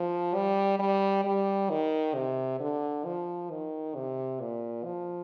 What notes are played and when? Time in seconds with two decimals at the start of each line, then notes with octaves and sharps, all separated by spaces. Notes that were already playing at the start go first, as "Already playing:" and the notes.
Already playing: F3
0.35 G3
0.79 G3
1.24 G3
1.70 D#3
2.14 C3
2.60 D3
3.05 F3
3.50 D#3
3.95 C3
4.40 A#2
4.85 F3